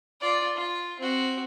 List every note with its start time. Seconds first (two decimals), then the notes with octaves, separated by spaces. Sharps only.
0.21 F4 D5
0.56 F4
1.00 C4 F#4